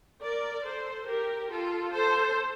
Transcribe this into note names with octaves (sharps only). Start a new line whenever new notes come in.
A#4 D5
A4 C5
G4 A#4
F4 A4
A4 C5